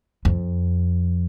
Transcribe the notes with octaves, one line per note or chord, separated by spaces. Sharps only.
F2